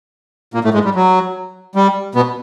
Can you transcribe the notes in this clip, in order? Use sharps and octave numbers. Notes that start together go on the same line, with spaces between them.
A#2 A#3
A2 A3
G#2 G#3
G3
F#3
G3
B2 B3